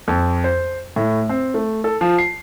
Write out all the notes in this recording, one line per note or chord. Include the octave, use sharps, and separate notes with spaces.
F2
C5
A2
C4
A3
A4
F3
C7